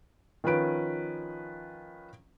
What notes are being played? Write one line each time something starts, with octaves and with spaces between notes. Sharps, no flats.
D#3 F3 C#4 B4 D7